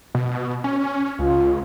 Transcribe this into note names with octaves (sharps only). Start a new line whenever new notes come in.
B2
C#4
C#2 F4